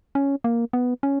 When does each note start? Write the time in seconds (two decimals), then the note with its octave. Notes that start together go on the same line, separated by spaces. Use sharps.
0.15 C#4
0.44 A#3
0.73 B3
1.03 C#4